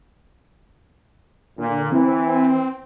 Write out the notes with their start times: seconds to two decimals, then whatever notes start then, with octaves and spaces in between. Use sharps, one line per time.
1.58 A#2 D3
1.92 E3 C4